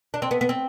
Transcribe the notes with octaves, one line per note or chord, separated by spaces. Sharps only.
D4
C4
B3
B3
C4